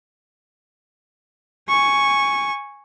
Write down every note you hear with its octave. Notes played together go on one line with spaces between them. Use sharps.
G#5 C#6